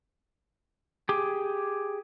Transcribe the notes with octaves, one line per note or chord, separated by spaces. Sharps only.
G4 G#4